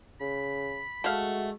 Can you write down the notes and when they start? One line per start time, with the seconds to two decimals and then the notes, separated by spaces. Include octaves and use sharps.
0.21 C#3 B5
1.04 G#3 A3 F#4 F5